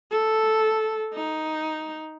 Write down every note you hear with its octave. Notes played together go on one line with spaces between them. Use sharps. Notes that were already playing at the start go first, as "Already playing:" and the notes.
A4
D#4